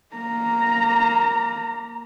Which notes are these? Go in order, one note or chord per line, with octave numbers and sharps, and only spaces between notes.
A#3 A#5